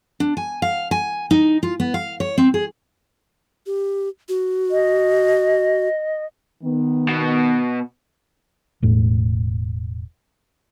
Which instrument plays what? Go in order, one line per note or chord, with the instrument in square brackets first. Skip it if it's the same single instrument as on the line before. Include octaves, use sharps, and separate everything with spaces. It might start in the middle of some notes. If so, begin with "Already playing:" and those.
[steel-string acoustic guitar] D4
G#5
F5
G#5
D#4
F4
B3
F5
C#5
C4
G#4
[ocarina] G4
F#4
[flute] D#5
[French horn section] D#3 B3
[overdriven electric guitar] B2
[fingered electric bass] E1 A2